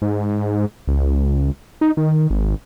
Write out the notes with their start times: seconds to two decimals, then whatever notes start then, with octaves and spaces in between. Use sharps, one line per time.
0.02 G#2
0.87 C#2
1.81 D#4
1.97 D#3
2.30 G#1